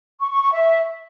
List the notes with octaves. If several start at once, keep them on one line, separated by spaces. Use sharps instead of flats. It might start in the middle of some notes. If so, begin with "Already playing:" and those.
C#6
C#6
C#6
E5